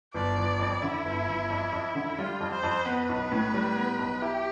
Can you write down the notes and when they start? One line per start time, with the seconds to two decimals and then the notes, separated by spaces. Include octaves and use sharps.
0.14 G1 D5
0.37 G1
0.59 F2
0.83 D3 E4
1.05 G1
1.27 G1
1.50 F2
1.73 F2
1.95 D3
2.18 G3 F4
2.40 F2
2.53 C5
2.63 F2
2.85 B3 B4
3.09 B1
3.32 A2
3.54 G3
3.76 B3
3.99 B1
4.22 E4 G4